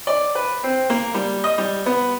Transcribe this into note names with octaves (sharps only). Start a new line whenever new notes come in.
D5
B4
C4
A#3
G3
D#5
G3
B3